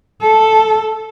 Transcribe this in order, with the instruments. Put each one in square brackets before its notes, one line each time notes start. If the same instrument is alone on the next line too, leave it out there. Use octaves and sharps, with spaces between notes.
[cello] A4